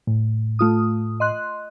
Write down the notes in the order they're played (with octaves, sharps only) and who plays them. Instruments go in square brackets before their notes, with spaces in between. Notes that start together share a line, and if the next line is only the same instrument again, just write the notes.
[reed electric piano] A2
[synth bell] A3 F4 D#6
D#5 C6 F#6